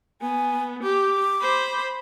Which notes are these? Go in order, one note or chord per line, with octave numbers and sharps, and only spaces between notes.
B3 G#5
G4 D6
C5 B5